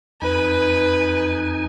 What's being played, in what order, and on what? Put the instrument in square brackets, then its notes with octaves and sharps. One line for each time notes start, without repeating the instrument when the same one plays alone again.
[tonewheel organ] F2 D#4 G#5 [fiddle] B4